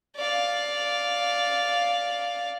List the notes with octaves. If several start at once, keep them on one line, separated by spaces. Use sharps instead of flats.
D5 F5